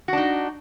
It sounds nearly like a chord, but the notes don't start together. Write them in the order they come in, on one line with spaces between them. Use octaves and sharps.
F#4 D4 D#4